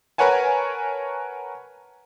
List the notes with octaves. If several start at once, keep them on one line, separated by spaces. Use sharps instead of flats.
A#4 B4 C#5 F#5 G#5 A5